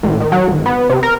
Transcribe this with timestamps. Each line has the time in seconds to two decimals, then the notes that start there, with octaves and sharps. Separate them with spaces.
0.03 A1
0.20 D#3
0.32 F#3
0.47 G#1
0.66 B3
0.90 C3
1.03 A#4